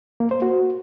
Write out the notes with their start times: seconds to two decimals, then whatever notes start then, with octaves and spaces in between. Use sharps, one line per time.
0.20 A#3
0.31 C5
0.42 F#4